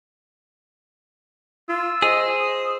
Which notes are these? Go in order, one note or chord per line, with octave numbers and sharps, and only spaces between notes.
F4 E6
G#4 C5 D#5
D#6